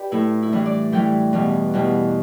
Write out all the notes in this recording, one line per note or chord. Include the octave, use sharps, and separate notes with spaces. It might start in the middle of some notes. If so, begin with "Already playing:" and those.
Already playing: G4 B4 D5
A2 A3 E4
E4
A2 E3 G3 D4
D5
A2 E3 G3 G5
E2 B2 G3
E2 B2 G3